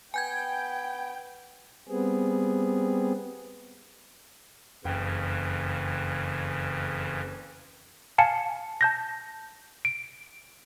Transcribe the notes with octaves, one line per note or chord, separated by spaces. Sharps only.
B3 B4 G5 G#5 G6 G#6
G3 B3 C4 G#4
F#1 F2 C#3 E3 G5
F5 G#5 A5 C#7
A5 G6 A#6
D7